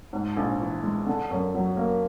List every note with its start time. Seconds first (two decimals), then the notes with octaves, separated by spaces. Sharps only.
0.13 G#2
0.37 A#1
0.60 E3
0.83 G#3
1.06 D3
1.30 F#2
1.54 F#3
1.77 A#3